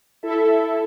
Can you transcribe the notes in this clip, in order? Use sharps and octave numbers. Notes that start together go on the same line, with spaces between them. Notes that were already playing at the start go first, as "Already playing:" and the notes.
E4 A4 E5